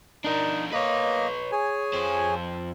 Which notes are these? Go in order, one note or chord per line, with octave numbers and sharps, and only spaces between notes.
D4 D#4 A#4
A#3 B4 C#5 D#5
G#4 C#5 G#5
F2 C5